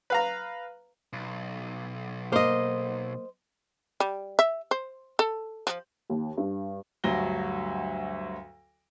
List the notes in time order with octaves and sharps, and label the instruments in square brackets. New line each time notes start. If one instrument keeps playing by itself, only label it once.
[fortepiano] B4 F5 A#5
[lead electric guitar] B1
[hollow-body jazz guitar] A#3 [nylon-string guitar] C5 D#5
[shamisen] G3
E5
C5
A4
F3
[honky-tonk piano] D#2
G2
[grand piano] D2 G2 F#3 A#6 G7